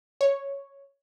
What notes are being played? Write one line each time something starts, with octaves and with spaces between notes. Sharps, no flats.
C#5